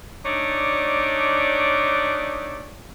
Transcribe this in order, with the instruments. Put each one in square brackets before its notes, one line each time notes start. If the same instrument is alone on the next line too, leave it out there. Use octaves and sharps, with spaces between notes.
[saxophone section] A3 D4 D#4 C#5 D5